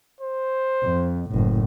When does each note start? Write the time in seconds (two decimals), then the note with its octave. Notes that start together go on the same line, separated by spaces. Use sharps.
0.21 C5
0.84 F2
1.31 F#1 A2